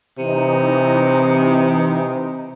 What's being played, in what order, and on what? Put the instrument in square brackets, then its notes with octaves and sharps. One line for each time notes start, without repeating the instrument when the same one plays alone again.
[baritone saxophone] C3 [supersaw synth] E3 D#4